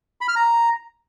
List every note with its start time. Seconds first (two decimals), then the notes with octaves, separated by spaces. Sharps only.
0.21 B5
0.28 F6
0.36 A#5